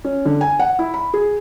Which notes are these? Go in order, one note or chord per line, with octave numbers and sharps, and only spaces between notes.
C#4
D3
G#5
F#5
E4
B5
G#4